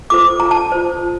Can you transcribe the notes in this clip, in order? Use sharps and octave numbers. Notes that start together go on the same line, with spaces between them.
F4 A4 C5 D6
A#5
A5
F4 A4 C5